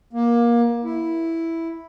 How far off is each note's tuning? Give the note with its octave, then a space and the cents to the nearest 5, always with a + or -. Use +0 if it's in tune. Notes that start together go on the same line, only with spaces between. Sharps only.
A#3 +20
E4 +0